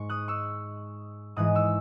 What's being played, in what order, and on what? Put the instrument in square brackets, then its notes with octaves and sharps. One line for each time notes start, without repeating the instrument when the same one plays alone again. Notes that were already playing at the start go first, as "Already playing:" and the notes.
Already playing: [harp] G#2 G#3 C#6
D#6 F#6
C#6 E6
G#2 E3 G#3 D#6 F#6
C#6 E6